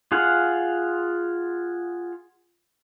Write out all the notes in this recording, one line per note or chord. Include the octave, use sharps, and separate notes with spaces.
F4 G#4 F5 F#5